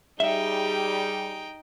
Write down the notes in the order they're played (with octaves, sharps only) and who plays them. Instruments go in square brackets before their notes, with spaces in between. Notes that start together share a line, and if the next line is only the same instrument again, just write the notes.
[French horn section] G3 G#4 [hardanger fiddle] D#4 G5 [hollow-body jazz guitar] E5